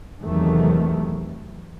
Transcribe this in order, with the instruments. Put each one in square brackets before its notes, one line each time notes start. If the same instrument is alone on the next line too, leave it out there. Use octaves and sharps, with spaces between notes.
[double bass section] E2 C3 D#3 F#3 A3